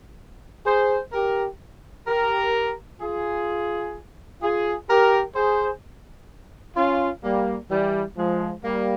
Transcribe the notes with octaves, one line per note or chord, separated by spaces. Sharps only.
G#4 C5
G4 A#4
G4 A#4
F4 G#4
F4 G#4
G4 A#4
G#4 C5
C#4 F4
G3 A#3
E3 G3
F3 G#3
G3 A#3